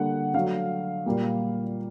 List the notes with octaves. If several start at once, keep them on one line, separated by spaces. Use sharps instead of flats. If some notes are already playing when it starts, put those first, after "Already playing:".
Already playing: D3 G3 A#3 F#5
D3 F#3 A3 F5
A#2 G3 A#3